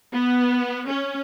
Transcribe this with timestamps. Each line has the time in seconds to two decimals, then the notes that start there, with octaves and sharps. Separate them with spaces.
0.12 B3
0.88 C#4